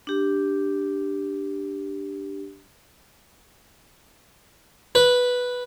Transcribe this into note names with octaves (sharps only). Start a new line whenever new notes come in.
D4 G4
B4